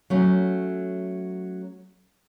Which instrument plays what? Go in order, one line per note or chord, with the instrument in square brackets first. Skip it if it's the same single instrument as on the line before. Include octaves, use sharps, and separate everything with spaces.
[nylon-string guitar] F#3 A3 C#4